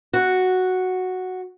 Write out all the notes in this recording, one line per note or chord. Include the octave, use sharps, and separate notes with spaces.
F#4